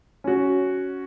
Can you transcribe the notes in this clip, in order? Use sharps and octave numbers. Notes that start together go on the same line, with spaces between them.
C#4 F#4